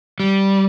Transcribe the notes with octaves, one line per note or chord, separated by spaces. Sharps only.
G3